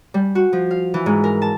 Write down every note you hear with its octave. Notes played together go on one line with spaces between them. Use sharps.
G3
F#4
F3
F5
E3
G#2
A#4
A5